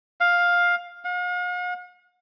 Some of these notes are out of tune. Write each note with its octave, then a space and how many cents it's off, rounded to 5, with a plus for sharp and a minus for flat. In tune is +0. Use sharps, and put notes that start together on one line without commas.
F5 +10
F5 +45